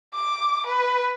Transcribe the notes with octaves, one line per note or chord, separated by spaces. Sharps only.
D6
B4